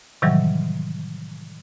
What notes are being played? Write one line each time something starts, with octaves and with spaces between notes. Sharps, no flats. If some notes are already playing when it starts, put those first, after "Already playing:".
A2 C3 D#3 E3 F#3 G3